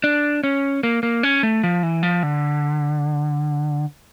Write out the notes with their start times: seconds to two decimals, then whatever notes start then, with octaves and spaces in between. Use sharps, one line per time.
0.04 D4
0.44 C#4
0.83 A#3
1.03 A#3
1.23 C#4
1.43 A3
1.63 F3
1.83 E3
2.03 F3
2.23 D3